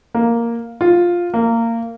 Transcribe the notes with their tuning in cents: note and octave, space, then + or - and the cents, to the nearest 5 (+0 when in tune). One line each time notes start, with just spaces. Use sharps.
A#3 +0
F4 +5
A#3 -20